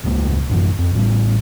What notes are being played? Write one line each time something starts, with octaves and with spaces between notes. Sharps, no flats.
E1 C#2 G#3 A#3
A1 F#2 E3
F2
A1 A2 G3